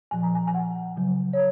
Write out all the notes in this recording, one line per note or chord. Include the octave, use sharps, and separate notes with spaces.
A#2 F3 G#5
A#5
G#5
G#5
F#5
C#3 F#3
C#5